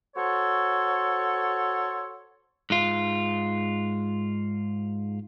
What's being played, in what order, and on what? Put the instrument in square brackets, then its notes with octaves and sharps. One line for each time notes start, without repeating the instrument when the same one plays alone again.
[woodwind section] F#4 A4 C5 C#5
[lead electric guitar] G#2 F4